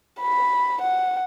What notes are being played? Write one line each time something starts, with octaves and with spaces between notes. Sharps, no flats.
B5
F#5